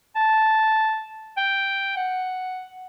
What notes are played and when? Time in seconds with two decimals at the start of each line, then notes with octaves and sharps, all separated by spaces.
0.16 A5
1.37 G5
1.97 F#5